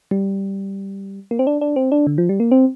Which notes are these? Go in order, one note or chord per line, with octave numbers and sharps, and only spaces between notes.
G3
A#3
C4
D4
D4
C4
D4
D3
F3
G3
A#3
C4